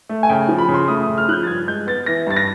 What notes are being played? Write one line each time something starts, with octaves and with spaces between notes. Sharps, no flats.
A3
G#5
C#3 G5
F3
B5
C#3
C6
A3 D#6
D#6
C#3
F6
F3 F#6 G6
A6
G2 G#6
G#3 G6
B3 A6
E3 A#6
G2 A6
A#6